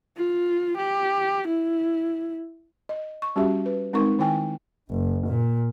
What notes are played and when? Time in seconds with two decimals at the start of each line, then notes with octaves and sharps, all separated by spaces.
0.17 F4
0.78 G4
1.48 E4
2.89 D#5
3.22 C#6
3.36 G3 C#4 F#4 G4 E5
3.66 B4
3.93 G#3 C4 D#4 A#4 C#6
4.19 D#3 E4 G5 G#5
4.90 F#1
5.27 A#2